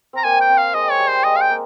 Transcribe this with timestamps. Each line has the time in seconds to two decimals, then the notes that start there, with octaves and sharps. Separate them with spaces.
0.13 C4 A#5
0.24 A#3 G#5
0.41 G5
0.49 C4
0.58 F5
0.74 G#3 D#5
0.91 C#5
0.99 G3
1.08 C5
1.24 G#3 D#5
1.36 F5
1.41 G5
1.50 A#3